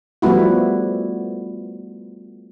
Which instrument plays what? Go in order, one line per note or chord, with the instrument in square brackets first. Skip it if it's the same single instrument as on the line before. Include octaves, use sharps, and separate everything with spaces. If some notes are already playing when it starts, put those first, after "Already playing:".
[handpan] F3 G3 A3 B3 E4 F#4